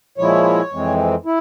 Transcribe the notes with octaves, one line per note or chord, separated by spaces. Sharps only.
A#2 F3 G#3 E4 C#5
F2 E3 G#3 C4
E4